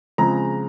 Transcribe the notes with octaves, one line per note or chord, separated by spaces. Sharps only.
C#3 F3 G#3 C4 A#5